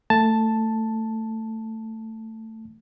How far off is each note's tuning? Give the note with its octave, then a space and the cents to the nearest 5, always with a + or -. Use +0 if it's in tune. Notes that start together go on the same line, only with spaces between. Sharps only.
A3 +15 A5 +0